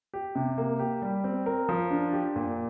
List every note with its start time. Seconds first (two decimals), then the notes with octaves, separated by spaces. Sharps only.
0.14 G4
0.35 C3
0.58 A#3
0.79 G4
1.02 G3
1.24 C4
1.46 A#4
1.69 F3
1.90 D4
2.13 G4
2.36 A#2